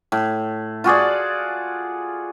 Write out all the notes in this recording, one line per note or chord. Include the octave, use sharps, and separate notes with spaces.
A2
F4 F#4 G#4 D5